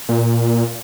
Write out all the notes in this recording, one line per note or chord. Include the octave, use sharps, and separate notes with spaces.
A#2